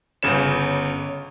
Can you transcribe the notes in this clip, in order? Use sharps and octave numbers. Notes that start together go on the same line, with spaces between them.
G1 C#3 C#5 E7